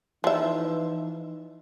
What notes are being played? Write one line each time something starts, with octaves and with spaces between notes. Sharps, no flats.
E3 F3 D#4 E5